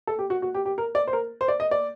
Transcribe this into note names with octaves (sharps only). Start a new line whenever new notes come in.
A4
G4
F#4
F#4
G4
G4
A#4
D5
C5
A#4
C5
D5
D#5
D5